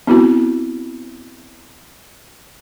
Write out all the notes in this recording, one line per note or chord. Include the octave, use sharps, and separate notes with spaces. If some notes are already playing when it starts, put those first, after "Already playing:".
B3 C4 E4 F#4